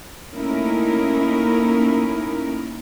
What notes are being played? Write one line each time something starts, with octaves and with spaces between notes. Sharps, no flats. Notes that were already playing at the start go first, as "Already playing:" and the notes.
A3 A#3 C#4 D#4 E4 A#4